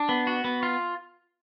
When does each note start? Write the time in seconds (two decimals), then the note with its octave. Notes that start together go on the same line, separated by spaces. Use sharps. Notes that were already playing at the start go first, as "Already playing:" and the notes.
Already playing: D4
0.09 B3
0.27 F#4
0.44 B3
0.63 F4